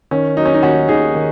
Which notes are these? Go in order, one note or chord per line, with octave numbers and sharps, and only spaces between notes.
D#3 C#4
F#3 D#4
C#4
D#4
D#2 C#4 F#4
D#2 D#4 G#4
D#3